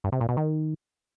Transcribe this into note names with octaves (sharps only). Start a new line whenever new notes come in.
G2
C3
A#2
B2
D#3